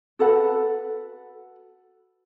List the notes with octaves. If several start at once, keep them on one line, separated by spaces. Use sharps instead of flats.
F#4 A4 B4 F#5